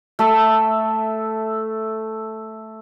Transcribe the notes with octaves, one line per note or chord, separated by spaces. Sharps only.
A3 A4 E5